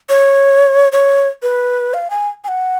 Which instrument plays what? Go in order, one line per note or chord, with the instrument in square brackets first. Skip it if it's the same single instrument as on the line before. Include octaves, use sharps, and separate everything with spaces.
[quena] C#5
C#5
B4
F5
G#5
G#5
F#5